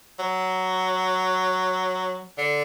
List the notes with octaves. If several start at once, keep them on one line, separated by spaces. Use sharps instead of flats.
F#3
D3